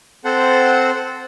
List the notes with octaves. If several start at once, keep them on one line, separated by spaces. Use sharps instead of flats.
C4 A4 C5 F#5